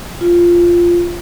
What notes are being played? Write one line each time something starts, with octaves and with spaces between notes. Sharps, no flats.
F4